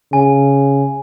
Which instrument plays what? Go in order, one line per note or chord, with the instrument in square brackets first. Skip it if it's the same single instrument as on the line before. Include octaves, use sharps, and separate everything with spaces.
[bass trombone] C#3 [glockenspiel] G#5